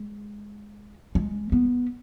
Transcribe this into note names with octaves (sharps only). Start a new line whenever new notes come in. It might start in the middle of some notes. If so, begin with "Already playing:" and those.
Already playing: G#3
G#3
B3